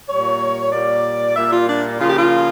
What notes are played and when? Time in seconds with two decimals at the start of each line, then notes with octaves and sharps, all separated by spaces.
0.09 A#2 G3 A#3 C#5
0.72 A#2 G3 A#3 D5
1.36 A#2 G3 A#3 E5
1.53 F4
1.68 D4
2.00 C#3 F3 A#3 F4
2.10 G4
2.18 F4